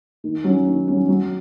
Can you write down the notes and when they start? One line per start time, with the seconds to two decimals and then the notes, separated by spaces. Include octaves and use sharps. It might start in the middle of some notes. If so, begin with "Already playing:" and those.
0.24 D#3
0.44 F#3 C#4
0.66 D#3
0.88 F#3 C#4
1.09 F#3